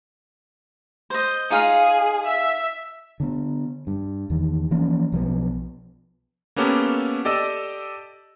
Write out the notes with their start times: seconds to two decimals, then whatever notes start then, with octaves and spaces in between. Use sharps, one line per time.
1.10 C5 D#5
1.50 D#4 F4 G#4 F5
2.27 E5
3.20 D3 B3
3.87 G2
4.30 E2 D#3
4.71 E3 F3 A#3 C#4
5.12 B1 F3 F#3 B3
6.56 A#3 B3 C#4 G4 A4
7.25 G4 A4 D5 D#5 G5 E6